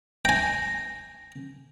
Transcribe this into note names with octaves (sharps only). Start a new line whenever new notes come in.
G5 G#5 A#6